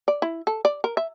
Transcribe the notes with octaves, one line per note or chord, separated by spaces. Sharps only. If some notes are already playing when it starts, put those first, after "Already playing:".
D5
E4
A4
D5
A#4
E5